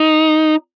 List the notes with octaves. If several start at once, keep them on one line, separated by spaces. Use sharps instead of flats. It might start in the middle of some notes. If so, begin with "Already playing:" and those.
Already playing: D#4